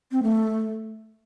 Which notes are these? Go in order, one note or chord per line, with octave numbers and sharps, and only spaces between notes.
C4
A3